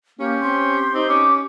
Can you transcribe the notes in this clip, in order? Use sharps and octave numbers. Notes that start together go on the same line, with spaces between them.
A#3 C#4 G4
C4 C6
C4 D#4
C#4 D6